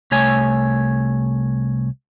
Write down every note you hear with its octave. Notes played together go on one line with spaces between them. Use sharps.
C2 A3 C#5 G#5